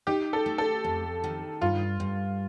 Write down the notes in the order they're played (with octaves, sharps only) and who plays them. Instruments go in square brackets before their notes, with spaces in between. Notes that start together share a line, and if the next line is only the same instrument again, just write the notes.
[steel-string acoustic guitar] D#4 [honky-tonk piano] G4
[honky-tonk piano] A4
[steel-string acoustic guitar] A3
[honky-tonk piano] A4
[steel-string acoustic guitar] F2
D#3
[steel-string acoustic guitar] G2 [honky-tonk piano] F4
[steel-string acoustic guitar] G2